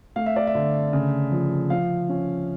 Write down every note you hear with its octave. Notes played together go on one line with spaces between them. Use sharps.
A3 F5
E5
D5
E5
D3
C#3
F3
F3 F5
C#4